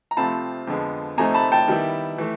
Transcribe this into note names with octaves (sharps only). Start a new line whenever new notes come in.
A#5
C3 F3 A3 C4 F4 A5 B5
F2 D3 F3 G#3 B3
C3 F3 A3 C4 D#4 G#5 A#5
A5 B5
G5 A5
D#3 G3 B3 E4
E3 A3